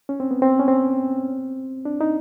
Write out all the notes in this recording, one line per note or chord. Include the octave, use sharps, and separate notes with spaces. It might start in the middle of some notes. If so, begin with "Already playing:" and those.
C#4
C4
B3
C4
C#4
C4
D4
D#4